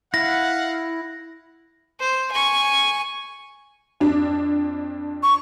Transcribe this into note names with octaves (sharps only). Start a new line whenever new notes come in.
E4 F5 F#5 A#6
C5
G#5 C#6
F2 D4
C#6